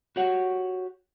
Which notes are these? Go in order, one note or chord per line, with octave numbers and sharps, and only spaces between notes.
F#4 G4 C#5 F#5